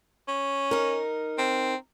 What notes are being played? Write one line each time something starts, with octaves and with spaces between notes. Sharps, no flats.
C#4
D#4 A#4
C4